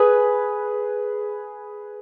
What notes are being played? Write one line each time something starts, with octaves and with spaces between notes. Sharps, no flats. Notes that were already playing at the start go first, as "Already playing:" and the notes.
Already playing: G#4 B4